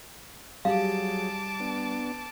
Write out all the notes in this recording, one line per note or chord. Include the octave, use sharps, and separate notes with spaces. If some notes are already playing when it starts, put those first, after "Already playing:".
F#3 G3 G#4 F5 A5 D6
B3 D4